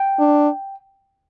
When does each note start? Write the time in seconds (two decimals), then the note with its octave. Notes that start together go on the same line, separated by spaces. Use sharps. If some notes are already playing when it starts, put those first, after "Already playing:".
Already playing: G5
0.19 D4